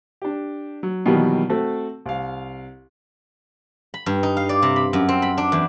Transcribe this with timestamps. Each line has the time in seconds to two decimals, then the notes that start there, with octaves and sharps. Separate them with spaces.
0.22 D4 G4
0.83 F#3
1.06 B2 D#3 E3 F#3 G3 A#3
1.50 A3 C4 F#4 A4
2.06 C2 F5
3.94 B5
4.06 G2
4.23 D#4
4.37 F5
4.49 D5
4.62 C3
4.76 B5
4.93 F#2
5.09 C4
5.22 B5
5.38 D4
5.52 E2